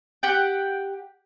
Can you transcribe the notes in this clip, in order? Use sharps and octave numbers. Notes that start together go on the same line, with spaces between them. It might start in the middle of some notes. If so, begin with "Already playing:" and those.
G4 F#5 G5